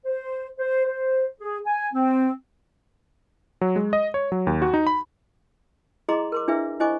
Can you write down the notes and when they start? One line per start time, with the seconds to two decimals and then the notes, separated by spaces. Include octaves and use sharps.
0.05 C5
0.59 C5
0.87 C5
1.40 G#4
1.66 G#5
1.93 C4
3.61 F#3
3.76 G#3
3.93 D#5
4.14 C#5
4.32 F#3
4.47 D#2
4.62 F#4
4.74 D#4
4.87 B5
6.08 E4 G#4 D#5 A#5 C6 D6
6.32 A#4 C6 D6
6.48 D4 E4 G#4 B4 E5
6.80 E4 C5 D#5 G#5 C#6 D6